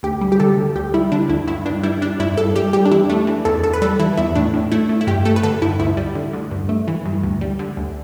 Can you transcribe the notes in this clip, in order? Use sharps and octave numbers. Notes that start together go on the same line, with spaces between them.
D2 G4
G3
G4
D3 A4
D2
D2 G4
G3 E4
D3 D4
D2 E4
G2 E4
G2 D4
G3 E4
G3 D4
G2 E4
G2 A4
G3 G4
G3 G4
D4
E2 E4
A3 D4
E3
E2 A4
E2 A4
B4
G3 A4
E3 E4
E2 E4
A2 D4
A2
A3 E4
A3
E4
G2 G4
A3 A4
B4
D3 A4
G2 E4
D2 E4
G3
D3
D2
G2
A3
E3
G2
D2
G3
D3
D2